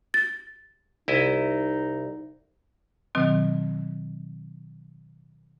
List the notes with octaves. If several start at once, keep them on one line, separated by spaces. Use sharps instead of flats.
A6
C2 D#4 E4 D#5
B2 D#3 F#3 C4